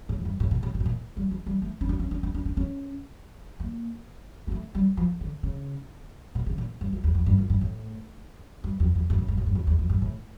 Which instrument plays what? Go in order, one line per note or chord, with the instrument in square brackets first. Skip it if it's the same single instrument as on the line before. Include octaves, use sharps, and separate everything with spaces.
[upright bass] A2
F2
G2
A2
A#2
A2
A#2
A2
A#2
G3
F3
G3
A3
C#4
D4
C#4
D4
D4
D4
D4
C#4
A#3
A#3
A3
G3
F3
D3
C#3
A#2
C#3
A#2
G2
F2
E2
F2
G2
F2
G2
A2
G2
F2
F2
G2
A2
G2
A2
G2
F2
E2
F2
G2
A2